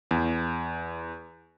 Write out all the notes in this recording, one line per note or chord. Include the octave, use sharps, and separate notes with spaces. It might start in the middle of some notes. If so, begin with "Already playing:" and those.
E2